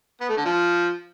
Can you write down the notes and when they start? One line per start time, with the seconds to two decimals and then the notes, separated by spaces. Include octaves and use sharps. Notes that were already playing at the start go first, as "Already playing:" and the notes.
0.21 B3
0.29 A3
0.37 D3
0.45 F3